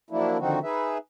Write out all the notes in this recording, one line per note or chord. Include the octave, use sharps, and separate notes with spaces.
F3 F#3 A#3 D4 E4
D3 D#3 F3 C4 D#4 F#4
D#4 G#4 B4 E5